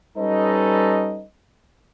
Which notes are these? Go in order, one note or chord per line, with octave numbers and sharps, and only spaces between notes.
G3 C#4 D#4 A4 B4 D#5